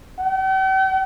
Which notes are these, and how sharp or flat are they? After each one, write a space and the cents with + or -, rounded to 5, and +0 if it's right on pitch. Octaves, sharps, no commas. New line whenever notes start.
G5 -45